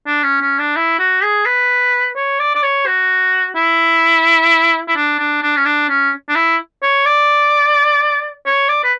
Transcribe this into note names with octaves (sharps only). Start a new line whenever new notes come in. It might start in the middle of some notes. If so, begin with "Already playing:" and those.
D4
C#4
C#4
D4
E4
F#4
G#4
B4
C#5
D5
D5
C#5
F#4
E4
E4
D4
D4
D4
C#4
D4
C#4
D4
E4
C#5
D5
C#5
D5
B4